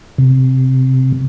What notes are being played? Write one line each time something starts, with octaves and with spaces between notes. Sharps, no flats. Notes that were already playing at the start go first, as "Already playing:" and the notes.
C3